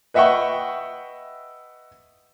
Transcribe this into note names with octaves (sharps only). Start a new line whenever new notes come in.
B4 D#5 E5 F#5 G5 C#6